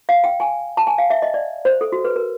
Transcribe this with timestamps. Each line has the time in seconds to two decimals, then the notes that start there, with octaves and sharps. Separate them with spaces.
0.09 F5
0.24 G5
0.40 G#5
0.77 A5
0.87 G#5
0.98 F5
1.10 E5
1.22 D#5
1.34 D5
1.65 C5
1.81 A4
1.92 F#4
2.05 B4
2.16 A#4